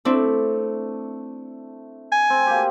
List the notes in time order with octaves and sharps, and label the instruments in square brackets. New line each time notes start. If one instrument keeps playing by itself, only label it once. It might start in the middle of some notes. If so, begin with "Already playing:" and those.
[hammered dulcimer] A3 [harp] C4 D4 E4
[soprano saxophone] G#5
[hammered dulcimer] C4
A#3 G4